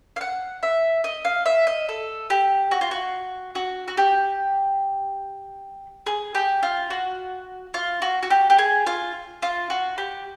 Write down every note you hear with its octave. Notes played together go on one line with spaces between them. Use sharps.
F5
F#5
E5
D#5
F5
E5
D#5
A4
G4
F#4
F4
F#4
F#4
F#4
G4
G#4
G4
F4
F#4
F4
F#4
F#4
G4
G4
G#4
F4
F4
F#4
G4